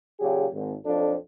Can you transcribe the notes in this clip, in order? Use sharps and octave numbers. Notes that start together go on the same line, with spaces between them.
A#2 C#3 F#3 G4 G#4
G#1
B1 F2 F3 D4 A4